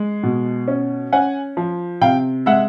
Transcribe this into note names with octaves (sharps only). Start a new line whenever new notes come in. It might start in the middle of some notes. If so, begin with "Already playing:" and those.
Already playing: G#3
B2
C#4
C#4 F#5 G#5
F3
C3 F5 G5
G#3 E5 F#5